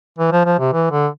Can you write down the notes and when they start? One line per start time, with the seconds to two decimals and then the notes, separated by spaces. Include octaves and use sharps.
0.18 E3
0.32 F3
0.46 F3
0.59 C3
0.73 E3
0.91 D3